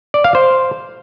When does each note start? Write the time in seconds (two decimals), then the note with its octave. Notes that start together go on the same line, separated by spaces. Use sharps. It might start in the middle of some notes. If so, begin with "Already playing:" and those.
0.14 D5
0.24 F5
0.35 C5